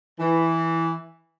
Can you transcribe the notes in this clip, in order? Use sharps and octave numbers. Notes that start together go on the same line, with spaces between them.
E3